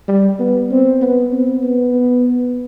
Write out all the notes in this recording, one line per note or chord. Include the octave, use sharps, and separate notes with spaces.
G3
B3
C4
B3
C4
B3